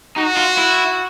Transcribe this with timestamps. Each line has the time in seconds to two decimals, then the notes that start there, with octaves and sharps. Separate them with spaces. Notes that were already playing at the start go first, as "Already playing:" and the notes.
0.16 D#4 F#4
0.37 F4
0.58 E4